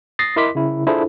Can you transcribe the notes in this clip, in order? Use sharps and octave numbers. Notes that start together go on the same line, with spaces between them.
D#6 A6 A#6 C7
E4 A#4 D#5 C6 D6 B6
C#3 E4
D4 E4 F4 G#4 A4 C5